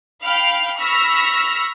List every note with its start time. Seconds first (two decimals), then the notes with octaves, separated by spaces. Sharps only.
0.24 F5 G5 B5 F6
0.78 B5 C#6 E6 F6 A#6 B6